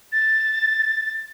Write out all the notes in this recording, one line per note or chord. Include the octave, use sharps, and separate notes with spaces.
A6